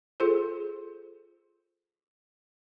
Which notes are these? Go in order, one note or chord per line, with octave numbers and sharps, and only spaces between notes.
F4 G#4 A4 C5